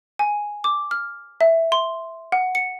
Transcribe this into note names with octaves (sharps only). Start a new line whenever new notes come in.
G#5
D6
F6
E5
C6
F#5
C#7